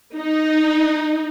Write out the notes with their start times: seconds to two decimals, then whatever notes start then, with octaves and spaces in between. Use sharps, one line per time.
0.15 D#4